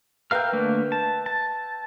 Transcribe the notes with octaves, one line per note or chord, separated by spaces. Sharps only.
A#4 B4 E5 F5 G5 F6
D3 A3 A#3
A5
A5